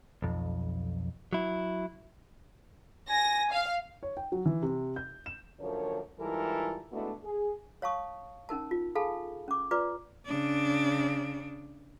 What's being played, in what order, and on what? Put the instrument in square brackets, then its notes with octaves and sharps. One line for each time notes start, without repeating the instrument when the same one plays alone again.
[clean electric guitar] B1 F2
F#3 E4
[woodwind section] G#5 [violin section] A#6
[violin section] F5
[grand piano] C#5
G5
F#3
E3
C3
G6
E7
[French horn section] F#2 D3 F3 A#3 A#4 C#5
G#2 E3 G3 F4 A4 A#4
G#3 A3 B3 D4 E4 F#4
G#4
[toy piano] C#5 F5 A5 C#6 D#6
C#4 D#4 A#4 A5
F4
G#4 A4 F5 G#5 A5 B5
C#4 D6
F4 B4 D5 A#5 D6
[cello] C#3 D4